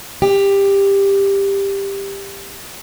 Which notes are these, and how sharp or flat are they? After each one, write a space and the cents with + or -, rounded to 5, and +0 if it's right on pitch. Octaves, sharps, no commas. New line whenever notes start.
G4 +10